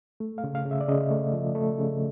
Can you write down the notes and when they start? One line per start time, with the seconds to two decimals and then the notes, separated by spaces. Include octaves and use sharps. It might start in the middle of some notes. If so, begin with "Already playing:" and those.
0.20 A3
0.38 F5
0.44 C#3
0.55 F5
0.66 C#3
0.71 E5
0.81 D5
0.88 C#3 D#5
1.11 A3
1.33 F3
1.55 A3
1.78 C#3